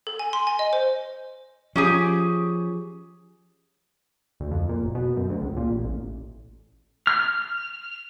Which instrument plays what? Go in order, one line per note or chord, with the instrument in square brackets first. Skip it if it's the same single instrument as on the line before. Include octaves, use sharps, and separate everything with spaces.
[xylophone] A4
G#5
C6
G#5
D#5
C5
[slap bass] F3 [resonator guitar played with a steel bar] C#4 G4 G#4
[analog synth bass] D2
F2
A#2
F#1
B2
F#2
D2
C#2
A#2
A1
A1
[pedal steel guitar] F6